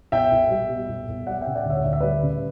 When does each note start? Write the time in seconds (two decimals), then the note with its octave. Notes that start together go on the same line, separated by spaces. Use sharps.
0.12 B1 E5 G5
0.32 B1
0.51 G3
0.69 B2
0.88 B1
1.09 B1
1.27 G3 D5 F#5
1.41 E5 G5
1.47 C#3
1.56 D5 F#5
1.66 D2 C#5 E5
1.84 D2 D5
1.93 E5
2.00 G3 B4 D5
2.23 C#3